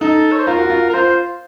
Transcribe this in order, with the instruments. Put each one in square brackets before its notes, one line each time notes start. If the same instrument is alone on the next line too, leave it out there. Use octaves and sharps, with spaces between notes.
[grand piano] D#4 [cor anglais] A4
[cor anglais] C#5
C5
[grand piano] F4 [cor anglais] A#4
[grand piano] F#4
F4
[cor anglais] A#4
[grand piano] F4 [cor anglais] C5